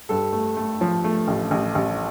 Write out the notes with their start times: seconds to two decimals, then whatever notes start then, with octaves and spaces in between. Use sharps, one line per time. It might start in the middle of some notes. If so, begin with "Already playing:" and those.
0.09 G2 A4
0.33 A3
0.57 A3
0.81 F3
1.04 A3
1.28 A1
1.51 A1
1.75 A1